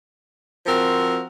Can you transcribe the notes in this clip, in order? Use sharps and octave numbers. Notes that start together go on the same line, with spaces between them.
F3 C4 F#4 A#4